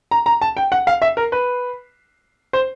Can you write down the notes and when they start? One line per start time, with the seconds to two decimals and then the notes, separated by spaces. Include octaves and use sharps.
0.11 A#5
0.26 A#5
0.42 A5
0.57 G5
0.72 F#5
0.87 F5
1.02 E5
1.17 A#4
1.32 B4
2.53 C5